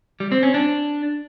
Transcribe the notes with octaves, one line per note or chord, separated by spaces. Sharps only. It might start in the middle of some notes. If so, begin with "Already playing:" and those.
G3
C4
C#4
D4